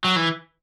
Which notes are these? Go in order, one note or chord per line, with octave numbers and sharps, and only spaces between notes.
F#3
E3